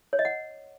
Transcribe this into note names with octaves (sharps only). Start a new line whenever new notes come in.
C#5
D#5
F#5